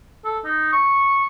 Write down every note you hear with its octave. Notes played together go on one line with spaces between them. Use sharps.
A4
D#4
C#6